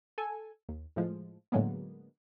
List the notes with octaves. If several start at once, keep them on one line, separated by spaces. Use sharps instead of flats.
A4 G#5
D#2
A2 F3 G#3
A2 D3 F#3 G#3 A#3 B3